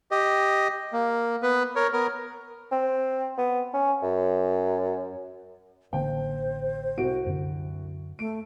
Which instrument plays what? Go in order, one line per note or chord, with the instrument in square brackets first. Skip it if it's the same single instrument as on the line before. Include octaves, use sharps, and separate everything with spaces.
[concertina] G4 D#5
A#3
B3 B4
A#4 C#5
B3 A#4
[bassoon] C4
B3
C#4
F#2
[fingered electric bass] A1 D3 A#3 [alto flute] C5 [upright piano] G5
[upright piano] C2 F#4 D7
[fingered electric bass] F#2 D3
[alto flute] A3 [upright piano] D7